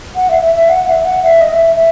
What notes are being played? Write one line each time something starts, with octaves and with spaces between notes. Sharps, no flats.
F#5
E5
E5
E5
F#5
E5
F#5
E5
D#5
E5
E5